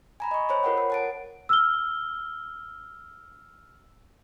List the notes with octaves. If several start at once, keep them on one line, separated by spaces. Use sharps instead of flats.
G#5 A#5 B5
D#5 C#6
C5 C#5 B5
F4 A4 A#4 C#5 F#5 G5
A#4
F#5 A5 D7
E6 F6 G7